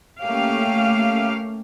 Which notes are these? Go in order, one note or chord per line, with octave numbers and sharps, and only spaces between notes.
A3 A#3 C#4 G4 F5